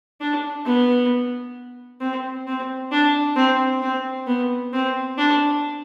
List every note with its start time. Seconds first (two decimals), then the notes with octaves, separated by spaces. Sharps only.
0.21 D4
0.66 B3
2.01 C4
2.47 C4
2.92 D4
3.36 C4
3.82 C4
4.27 B3
4.73 C4
5.18 D4